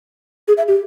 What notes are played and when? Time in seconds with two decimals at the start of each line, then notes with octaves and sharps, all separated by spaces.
0.48 G#4
0.57 E5
0.68 G4